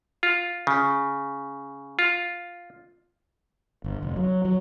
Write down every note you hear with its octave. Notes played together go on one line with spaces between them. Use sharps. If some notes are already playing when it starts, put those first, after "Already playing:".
F4
C#3
F4
G1
F1
F#3
F#3